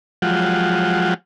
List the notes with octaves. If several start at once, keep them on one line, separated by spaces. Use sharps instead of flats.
F3 F#3 G#3 F4 G4 F#5